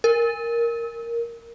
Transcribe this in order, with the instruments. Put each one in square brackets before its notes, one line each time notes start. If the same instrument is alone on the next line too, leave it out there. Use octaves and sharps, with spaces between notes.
[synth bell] A#4